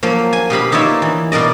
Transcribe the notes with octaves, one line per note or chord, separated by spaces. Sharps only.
F3 F#3 A#3
G#5
B2 G4 F5 B5
A#3 D#4 F4 C#5 D5 E5
E3
B2 A#4 D5 D#5